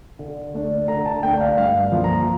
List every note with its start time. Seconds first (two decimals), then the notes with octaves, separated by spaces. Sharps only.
0.19 D3
0.54 A3 D4
0.88 D3 A#5
1.06 A5
1.23 A3 D4 G5
1.41 F5
1.57 G2 F5
1.92 F3 A#3
2.04 A#5